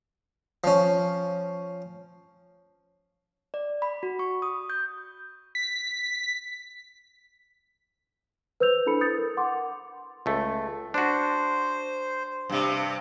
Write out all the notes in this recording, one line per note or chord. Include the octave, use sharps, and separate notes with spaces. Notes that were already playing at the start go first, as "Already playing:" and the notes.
F3 C#4
D5
B5
F#4
C#6
D#6
G6
B6
B4 C5 E6 G6 F7
D4 E4 A4 B5 C#7
D#6 G6 A6 C#7
A#4
F#5 C6 D6
C#2 A3
D4 F#4 C5
G2 C3